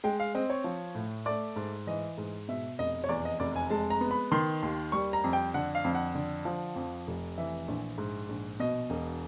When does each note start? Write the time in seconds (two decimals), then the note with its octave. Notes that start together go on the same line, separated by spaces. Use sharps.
0.04 G#3 G5
0.20 F5
0.35 C4 D#5
0.50 C#5
0.64 F3
0.95 A2
1.26 A3 D5
1.56 G#2
1.87 E3 D#5
2.18 G#2
2.48 B2 E5
2.79 F1 D#5
3.04 C#5
3.09 E2 D5
3.25 D#5
3.40 F1 D5
3.56 G#5
3.70 G#3 A5
3.90 A#5
4.01 B3
4.11 B5
4.32 D#3 C6
4.63 D#2
4.92 G3 C#6
5.13 A#5
5.24 F2
5.33 G5
5.54 D3 F#5
5.75 F5
5.84 F2
5.95 F#5
6.15 D3
6.45 F3
6.76 F2
7.07 F1
7.38 E3 E5
7.68 A#1
7.98 G#2
8.29 A#1
8.60 B2 D#5
8.90 E1